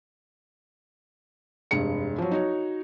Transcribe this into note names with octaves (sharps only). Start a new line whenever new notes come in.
F1 G2 G#3 C#7
F3 F#3
D#4 F#4 C#5